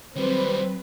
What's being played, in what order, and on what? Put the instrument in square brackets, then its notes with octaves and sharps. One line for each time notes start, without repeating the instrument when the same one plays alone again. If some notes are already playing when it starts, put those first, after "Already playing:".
[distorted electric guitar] D#3 G3 [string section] F#3 B4 [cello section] C4 [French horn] C5